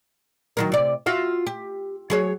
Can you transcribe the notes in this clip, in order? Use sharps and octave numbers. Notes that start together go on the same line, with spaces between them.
D#3 F#3 A#4
C3 D5
F4 F#4 E5
G4
F#3 G#4 C#5